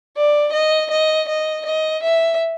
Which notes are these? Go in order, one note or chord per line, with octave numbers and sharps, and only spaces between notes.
D5
D#5
D#5
D#5
D#5
E5